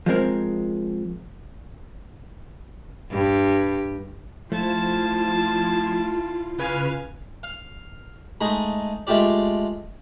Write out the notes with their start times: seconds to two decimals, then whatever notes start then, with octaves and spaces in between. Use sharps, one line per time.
0.06 F3 G#3 C4 A#4
3.11 G2 G4
4.52 F3 A3 E4 F4 A5 G#6 E7
6.59 C#3 B4 F5 G#5 F6
7.43 F5
8.41 G#3 A3 D#4 G#4
9.07 G#3 A3 F4 G4 D5